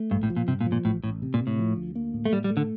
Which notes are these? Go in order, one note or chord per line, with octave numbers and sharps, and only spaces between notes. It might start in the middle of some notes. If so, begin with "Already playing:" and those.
Already playing: A3
A#1 G2
A2
F3
A#2
G2 C3
A#2
F3
A#2
A1 A2
A1 A2
C3
A#2
C3
A2
F3
D2
A#3
A2
A3
A2 G3
G3
A3
D3